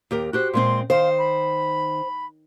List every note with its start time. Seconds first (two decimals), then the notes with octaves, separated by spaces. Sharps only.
0.11 D#2 G4 A#4
0.33 F#4 G4 C5 F#6
0.54 A#2 G#3 C4 C6
0.90 D#3 C5 F5
1.19 B5